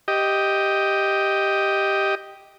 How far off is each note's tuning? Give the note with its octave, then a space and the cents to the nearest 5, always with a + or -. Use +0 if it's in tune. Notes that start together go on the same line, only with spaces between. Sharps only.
G4 +0 D#5 +5